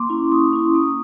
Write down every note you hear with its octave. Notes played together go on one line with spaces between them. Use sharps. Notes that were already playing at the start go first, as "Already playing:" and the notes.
Already playing: A#3 C6 D6
C#4 E4
A#3 C#6 D#6
C#4 E4
A#3 C#6 D#6